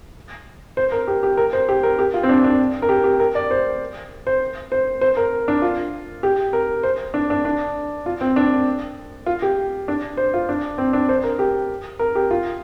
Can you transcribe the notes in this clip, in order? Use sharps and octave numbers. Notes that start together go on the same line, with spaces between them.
C5
A#4
G4
G4
A#4
C5
G4
A#4
G4
F4
C4
D4
D4
A#4
G4
G4
A#4
D5
C5
C5
C5
C5
A#4
D4
F4
G4
A#4
C5
D4
D4
D4
F4
C4
D4
F4
G4
D4
C5
F4
D4
C4
D4
C5
A#4
G4
A#4
G4
F4